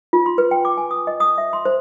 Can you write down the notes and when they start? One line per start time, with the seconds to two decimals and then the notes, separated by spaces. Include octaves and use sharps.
0.13 F4
0.26 C6
0.38 B4
0.51 G5
0.65 D6
0.78 G#5
0.91 D#6
1.07 D#5
1.20 D#6
1.38 E5
1.53 C6
1.65 C5